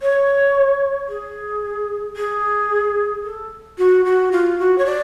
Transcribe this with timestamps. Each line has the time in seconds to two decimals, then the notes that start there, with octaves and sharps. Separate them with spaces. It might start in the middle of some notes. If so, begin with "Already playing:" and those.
0.02 C#5
1.09 G#4
2.16 G#4
3.24 A4
3.78 F#4
4.05 F#4
4.32 F4
4.59 F#4
4.78 C#5
4.86 D5